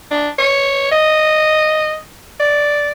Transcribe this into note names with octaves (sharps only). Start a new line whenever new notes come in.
D4
C#5
D#5
D5